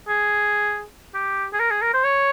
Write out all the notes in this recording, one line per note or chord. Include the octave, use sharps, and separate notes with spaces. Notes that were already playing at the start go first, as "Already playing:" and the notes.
G#4
G4
G#4
A#4
G#4
A#4
C5
C#5